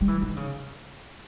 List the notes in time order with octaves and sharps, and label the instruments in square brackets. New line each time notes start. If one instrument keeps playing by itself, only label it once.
[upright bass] G3
E3
D#3
C#3